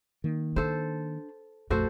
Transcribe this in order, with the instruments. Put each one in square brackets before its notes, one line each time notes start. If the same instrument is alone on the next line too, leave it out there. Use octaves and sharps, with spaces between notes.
[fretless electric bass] D#3 A#3
[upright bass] D4 [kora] A4 C5
[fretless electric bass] A#1 F2 [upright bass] A3 [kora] F#4 A4 C5